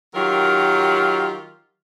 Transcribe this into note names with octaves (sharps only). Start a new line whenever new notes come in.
D#3 F#3 F4 G4 A#4